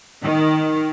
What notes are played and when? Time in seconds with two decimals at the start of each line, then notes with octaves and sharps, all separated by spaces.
0.23 D#3